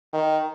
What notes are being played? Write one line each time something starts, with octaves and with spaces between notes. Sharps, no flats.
D#3